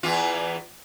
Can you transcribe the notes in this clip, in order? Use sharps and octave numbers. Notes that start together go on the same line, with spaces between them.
E2 E3 F4